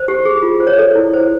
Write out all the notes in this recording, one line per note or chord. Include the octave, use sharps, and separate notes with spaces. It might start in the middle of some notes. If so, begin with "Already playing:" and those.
Already playing: C5
G4
G#4
F4
C5
C#5
A4 D5
E4
C5